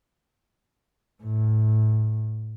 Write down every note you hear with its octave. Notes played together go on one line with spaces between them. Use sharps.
A2